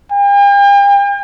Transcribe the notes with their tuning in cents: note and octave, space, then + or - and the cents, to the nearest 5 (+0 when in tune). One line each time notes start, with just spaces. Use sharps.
G5 +45